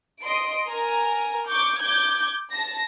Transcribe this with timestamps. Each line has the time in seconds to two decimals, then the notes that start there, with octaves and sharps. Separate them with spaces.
0.23 D#5 C6 D7
0.69 A#4 G#5 A#5
1.48 C#6 D6 G6
1.81 D6 G6 G#6
2.52 A5 A#6